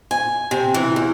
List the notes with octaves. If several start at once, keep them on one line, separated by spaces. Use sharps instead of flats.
G#5
C3
E3
E2